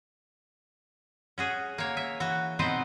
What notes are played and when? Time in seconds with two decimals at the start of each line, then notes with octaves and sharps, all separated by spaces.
1.38 C#4 F#4 G#4
1.78 A#3 C#5
1.97 E5
2.20 E3 F#4
2.59 B2 C4 D#4 B4 C5